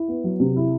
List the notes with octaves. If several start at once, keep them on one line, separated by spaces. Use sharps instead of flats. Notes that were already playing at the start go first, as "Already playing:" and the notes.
Already playing: E4
B3
F#3
C3
E4